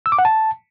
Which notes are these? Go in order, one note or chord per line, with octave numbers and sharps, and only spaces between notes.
E6
D6
F#5
A5